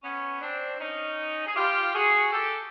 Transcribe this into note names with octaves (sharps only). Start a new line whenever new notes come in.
B3 C#4
C4 D4
C#4 D#4
G#4
F4 G4
F#4 G#4
G4 A4